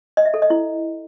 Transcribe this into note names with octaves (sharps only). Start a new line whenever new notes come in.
D#5
E5
A4
D#5
E4